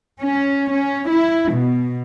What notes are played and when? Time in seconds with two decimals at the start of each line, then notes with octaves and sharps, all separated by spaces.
0.20 C#4
0.71 C#4
1.10 E4
1.52 B2